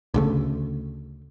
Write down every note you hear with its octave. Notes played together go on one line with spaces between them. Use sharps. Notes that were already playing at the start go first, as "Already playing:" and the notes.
D2 C#3 A3